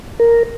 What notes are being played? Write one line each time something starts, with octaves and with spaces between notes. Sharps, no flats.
A#4